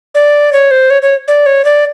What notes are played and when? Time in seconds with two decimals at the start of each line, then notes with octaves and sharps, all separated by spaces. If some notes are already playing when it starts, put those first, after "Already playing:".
0.15 D5
0.53 C#5
0.71 C5
0.90 C#5
1.02 C#5
1.28 D5
1.46 C#5
1.65 D5